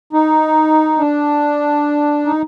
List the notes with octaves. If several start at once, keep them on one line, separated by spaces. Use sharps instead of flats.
D#4
D4
D#4